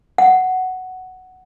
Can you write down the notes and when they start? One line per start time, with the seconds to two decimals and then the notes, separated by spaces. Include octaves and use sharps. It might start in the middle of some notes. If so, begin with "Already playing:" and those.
0.18 F#5